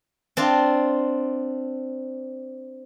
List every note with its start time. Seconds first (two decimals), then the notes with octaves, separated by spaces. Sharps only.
0.37 C4 D4 F4